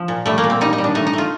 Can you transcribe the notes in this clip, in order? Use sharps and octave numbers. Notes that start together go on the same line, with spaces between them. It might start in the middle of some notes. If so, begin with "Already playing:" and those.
Already playing: F3
A#2
G3 A3
A#3
A#2
C4
G3 D#4
D#4
G3
D4
A3 D#4
D#4
A3 F4